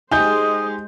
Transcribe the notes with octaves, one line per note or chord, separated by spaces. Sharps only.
G#3 D#4 G4 C5 G#5 D#6 G6